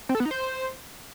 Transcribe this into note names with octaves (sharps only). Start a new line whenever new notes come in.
C4
A4
B3
D#4
C5